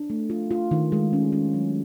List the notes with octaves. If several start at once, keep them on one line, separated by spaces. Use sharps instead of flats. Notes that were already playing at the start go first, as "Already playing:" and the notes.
Already playing: D4
A3
F4
F4
D#3
G#3
C#4
C#4
F#3